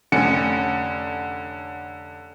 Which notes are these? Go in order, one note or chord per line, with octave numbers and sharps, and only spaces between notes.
F1 D3 C#4 C#7